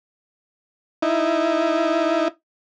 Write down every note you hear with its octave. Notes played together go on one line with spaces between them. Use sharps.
D#4 E4